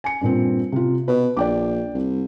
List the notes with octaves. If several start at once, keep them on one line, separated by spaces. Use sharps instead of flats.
G#5 C#7
G2 A#2 C4
C3 F4
B2 B4
A#1 D5 G5 D6
C2